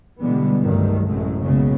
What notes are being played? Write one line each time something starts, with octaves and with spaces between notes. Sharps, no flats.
B2 D3 E3 G3 G#3 B3
C2 G2 D#3 F#3 G3 A3
A1 F#2 C3 G#3 A3
F#1 B1 C#3 G#3 B3